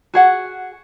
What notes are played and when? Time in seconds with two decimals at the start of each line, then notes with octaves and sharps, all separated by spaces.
0.14 F#4 G#4 F#5